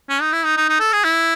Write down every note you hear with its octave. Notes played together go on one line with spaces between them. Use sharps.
C#4
D#4
E4
D#4
D#4
D#4
A4
G#4
E4